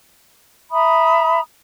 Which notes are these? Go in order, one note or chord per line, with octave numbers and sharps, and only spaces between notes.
E5 A#5 B5 D#6